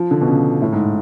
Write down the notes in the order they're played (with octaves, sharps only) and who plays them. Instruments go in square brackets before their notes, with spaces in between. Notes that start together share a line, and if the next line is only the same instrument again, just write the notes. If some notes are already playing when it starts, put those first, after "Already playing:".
Already playing: [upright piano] F3
D3
B2
C#3
A2
G#2